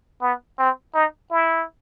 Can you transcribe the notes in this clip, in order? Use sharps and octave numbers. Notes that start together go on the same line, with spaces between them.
B3
C4
D#4
E4